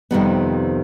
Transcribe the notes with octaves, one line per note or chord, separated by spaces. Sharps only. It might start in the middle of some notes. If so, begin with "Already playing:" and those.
F2 C3 D#3 G3 B3